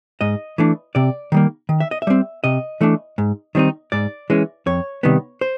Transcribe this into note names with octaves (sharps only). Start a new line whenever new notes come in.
G#2 D#5
E3 A3 D4
C3 D5
D#3 G3 A#3
D#3
E5
D#5
E5
G3 C4
C3 D#5
E3 A3 D4
G#2
D#3 G3 C4 D#4
G#2 D5
E3 G#3 C#4
F2 C#5
C3 D#3 G3 B3
C5